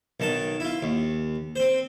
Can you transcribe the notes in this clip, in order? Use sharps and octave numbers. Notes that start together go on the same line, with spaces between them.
B1 D#3 A5
E4 F4
D#2
C4 C5